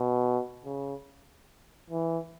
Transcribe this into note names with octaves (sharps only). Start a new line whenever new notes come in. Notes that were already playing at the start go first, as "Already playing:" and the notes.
Already playing: B2
C#3
E3